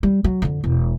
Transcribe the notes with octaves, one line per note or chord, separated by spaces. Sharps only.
G3
F#3
F2 D3
E1